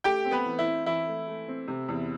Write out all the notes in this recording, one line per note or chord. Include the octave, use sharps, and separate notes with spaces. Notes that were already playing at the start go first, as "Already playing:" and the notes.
A3 G4 G5
C4
B3 B4
E3
E4
C4
E3 E4
A3
A3
C4
C3
E2